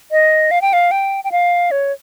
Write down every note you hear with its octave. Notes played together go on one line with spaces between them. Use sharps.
D#5
F5
G5
F5
G5
G5
F5
C#5